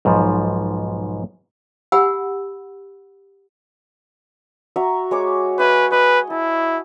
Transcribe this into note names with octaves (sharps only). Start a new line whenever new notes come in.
B1 G#2 B2 F3
G4 F#5 G#5 B5 E6
F#4 E5 A#5
G#3 C#5 D6
B4 E5 G#5
B4 D#5
E4 A5